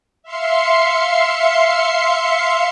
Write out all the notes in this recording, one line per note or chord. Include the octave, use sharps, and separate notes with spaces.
E5 F5 C6 C7 C#7